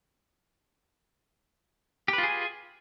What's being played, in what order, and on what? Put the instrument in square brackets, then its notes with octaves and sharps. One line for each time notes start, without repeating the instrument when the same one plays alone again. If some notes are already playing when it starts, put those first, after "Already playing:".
[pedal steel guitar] G4
B4
F4
G#4
G#5